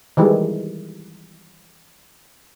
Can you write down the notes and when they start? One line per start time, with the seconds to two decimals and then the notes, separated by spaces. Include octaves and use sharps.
0.17 D#3 E3 G3 G#3